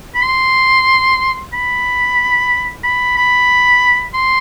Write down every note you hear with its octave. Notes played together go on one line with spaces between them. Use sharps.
B5
C6
B5
B5
B5
C6